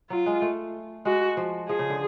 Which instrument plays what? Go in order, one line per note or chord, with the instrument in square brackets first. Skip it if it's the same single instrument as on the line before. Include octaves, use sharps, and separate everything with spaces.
[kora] F#3 [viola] F4
[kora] G#3
A3
[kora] G#3 [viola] F#4
[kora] F3
[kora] F3 [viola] G#4
[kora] C#3
D3